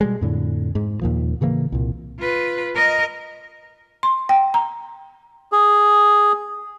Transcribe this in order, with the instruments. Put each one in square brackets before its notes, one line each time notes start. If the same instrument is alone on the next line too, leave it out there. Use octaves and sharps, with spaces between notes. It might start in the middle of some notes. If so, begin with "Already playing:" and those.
[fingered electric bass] B2 G3 G#3
F2 A2 D3
G#2
D#2 A#2 F3
A2 C#3 E3 A#3
C2 A#2
[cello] F4 B4
A#4 D#5
[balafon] C6
G5
A#5
[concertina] G#4